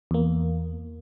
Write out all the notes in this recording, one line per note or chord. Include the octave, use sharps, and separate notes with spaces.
E2 A#3